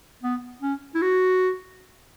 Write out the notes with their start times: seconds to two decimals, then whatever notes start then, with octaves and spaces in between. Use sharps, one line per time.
0.23 B3
0.62 C#4
0.95 E4
1.02 F#4